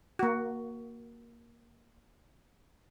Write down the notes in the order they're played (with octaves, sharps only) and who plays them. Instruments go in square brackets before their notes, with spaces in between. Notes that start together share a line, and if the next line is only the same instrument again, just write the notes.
[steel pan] A#3 F#4